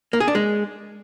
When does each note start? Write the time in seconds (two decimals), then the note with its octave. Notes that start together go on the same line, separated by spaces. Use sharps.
0.13 A#3
0.20 G#4
0.28 D4
0.35 G#3